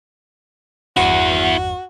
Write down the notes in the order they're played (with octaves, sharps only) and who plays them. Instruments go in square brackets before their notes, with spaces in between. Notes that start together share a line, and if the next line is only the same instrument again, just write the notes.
[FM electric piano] G1 E2 G2 [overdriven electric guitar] E4 F#5 [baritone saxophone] F#4